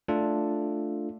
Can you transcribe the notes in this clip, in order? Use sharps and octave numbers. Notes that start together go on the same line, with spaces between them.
A3 D4 F4 A4